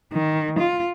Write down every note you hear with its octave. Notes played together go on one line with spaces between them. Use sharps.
D#3
F4